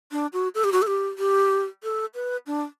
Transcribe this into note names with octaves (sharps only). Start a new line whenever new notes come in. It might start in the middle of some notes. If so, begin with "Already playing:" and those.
D4
F#4
A4
G4
F#4
A4
G4
G4
A4
B4
D4